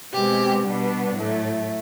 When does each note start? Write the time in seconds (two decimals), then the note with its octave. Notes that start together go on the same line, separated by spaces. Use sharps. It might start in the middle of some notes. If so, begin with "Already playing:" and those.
0.13 B2 G#3 C4 G4
0.64 B2 G3 B3 D4
1.15 A2 F#3 A3